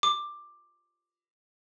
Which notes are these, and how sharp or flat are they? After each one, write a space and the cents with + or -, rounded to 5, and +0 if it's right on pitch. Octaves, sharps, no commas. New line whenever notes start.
D6 +10